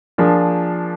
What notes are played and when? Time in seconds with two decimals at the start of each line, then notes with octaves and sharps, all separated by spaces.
0.18 F3 A#3 D4 F4 G#4